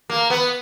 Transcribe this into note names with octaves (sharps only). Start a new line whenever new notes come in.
A#3
B3